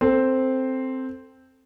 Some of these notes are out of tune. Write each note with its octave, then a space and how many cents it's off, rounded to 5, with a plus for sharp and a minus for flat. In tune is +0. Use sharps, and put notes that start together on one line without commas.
C4 +0 A4 +10 C5 +0